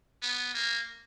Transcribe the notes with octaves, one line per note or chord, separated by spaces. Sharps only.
B3
A#3